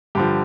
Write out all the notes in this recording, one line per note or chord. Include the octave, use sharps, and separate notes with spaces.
G2 D3 F3 G4